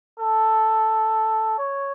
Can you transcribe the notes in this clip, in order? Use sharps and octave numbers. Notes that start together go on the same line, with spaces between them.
A4
C#5